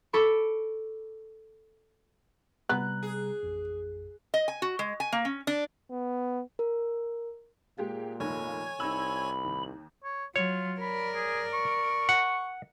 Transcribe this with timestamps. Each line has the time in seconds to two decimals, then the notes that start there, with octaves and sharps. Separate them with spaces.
0.13 A4 B5 C#6 D6
2.69 C3 G3 B3 A#5 F#6
3.03 G#4
3.43 A1 F2
4.34 D#5
4.48 G#5
4.62 F#4
4.79 G#3
5.00 G#5
5.12 A#3
5.25 C#4
5.47 D4
5.91 B3
6.59 A#4
7.78 A#2 G#3 A#3 G4
8.20 F1 D#3 C#5 G#5 G#6
8.80 C2 D#4 B5 E6
9.44 D#2
10.04 C#5
10.36 F#3 F4 C#5
10.81 A#4 D5 B5
11.15 G#4
11.54 C#6
12.09 F#5